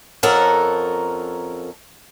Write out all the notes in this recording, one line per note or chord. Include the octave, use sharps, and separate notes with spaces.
F2 C#4 A4 A#4 F#5 A#5